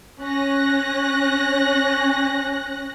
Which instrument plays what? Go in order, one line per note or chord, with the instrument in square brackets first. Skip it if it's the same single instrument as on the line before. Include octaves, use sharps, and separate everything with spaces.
[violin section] C#4 F#6 A#6